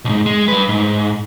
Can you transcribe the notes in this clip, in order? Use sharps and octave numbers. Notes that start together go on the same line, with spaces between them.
B1 G#2
G#3
G3 B4
G#2